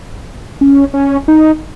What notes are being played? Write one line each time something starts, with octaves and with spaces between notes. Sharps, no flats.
C#4
C#4
D#4